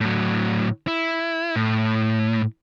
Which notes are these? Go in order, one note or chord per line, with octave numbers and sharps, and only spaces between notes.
A2 F#3
E4
A2